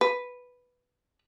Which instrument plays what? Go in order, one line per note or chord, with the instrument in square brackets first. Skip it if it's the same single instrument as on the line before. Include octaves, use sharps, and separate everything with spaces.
[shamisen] B4